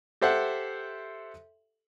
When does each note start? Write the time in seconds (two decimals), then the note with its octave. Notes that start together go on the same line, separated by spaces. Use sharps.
0.21 G4 A4 C5 E5 F#5